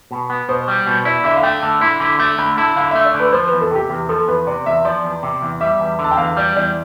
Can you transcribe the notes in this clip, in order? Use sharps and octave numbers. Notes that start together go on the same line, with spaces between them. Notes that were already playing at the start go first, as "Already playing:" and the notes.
B2
B3
B2 C5
G3
B2
E4 D5
D3 E5
F5
A3 G5
D3 A5
E4 C6
D3 D6
A3 D6
D3 B5
E4 A5
D3 F5
A3 E5
D5
D3
B4
F3 C5
B4
E2
A4
C3 G4
E2 G4
F3 A4
E2 B4
C3 D5
E2 E5
F3 D5
E2
C3
E2
G3 E5
E2
D3
A5
G5
E2 F5
G3 D5
E2 D5